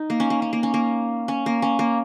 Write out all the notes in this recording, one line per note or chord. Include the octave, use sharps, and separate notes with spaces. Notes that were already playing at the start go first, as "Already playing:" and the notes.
Already playing: D#4
A#3
C#4
A#3
C#4
A#3
C#4
A#3
C#4
A#3
C#4
A#3